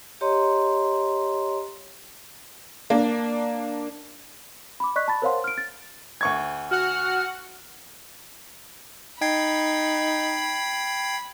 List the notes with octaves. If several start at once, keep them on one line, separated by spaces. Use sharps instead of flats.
G4 C#5 D#5 A#5 C6
A#3 D4
B5 D6
D5 D#5 C#6 F#6 B6
A5 B5 A6
A#4 C5 C#5 F5 F#5 C6
F6 D7
A6
D2 C#6 G#6
F#4 F#5 F6
D#4 G5 B5 G#6 C7